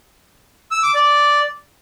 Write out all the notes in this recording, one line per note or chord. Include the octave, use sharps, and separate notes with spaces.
E6
D6
D5